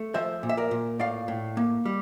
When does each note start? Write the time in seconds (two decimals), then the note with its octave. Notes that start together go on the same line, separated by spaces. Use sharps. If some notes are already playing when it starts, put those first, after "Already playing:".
Already playing: A3
0.14 F3 C5 E5
0.43 A#2
0.49 E5
0.57 A#4 D5
0.71 A#2
0.99 A2 D5 F5
1.28 A2
1.57 A#3
1.85 G3